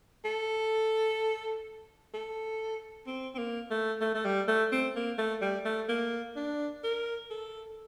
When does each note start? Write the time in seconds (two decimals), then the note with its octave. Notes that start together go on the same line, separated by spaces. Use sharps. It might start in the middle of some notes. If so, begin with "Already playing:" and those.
0.25 A4
2.14 A4
3.07 C4
3.34 C4
3.38 A#3
3.70 A3
4.01 A3
4.14 A3
4.25 G3
4.48 A3
4.72 C4
4.95 A#3
5.18 A3
5.41 G3
5.65 A3
5.88 A#3
6.36 D4
6.84 A#4
7.30 A4